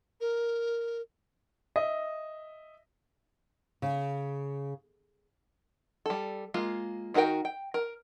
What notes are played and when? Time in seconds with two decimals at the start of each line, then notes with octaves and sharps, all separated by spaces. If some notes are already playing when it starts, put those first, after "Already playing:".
0.21 A#4
1.76 D#5 E5
3.82 C#3
6.06 G3 A4
6.54 G#3 A#3 F4
7.14 D#3 D#4 F#4 A#4 G5
7.45 G5
7.74 A#4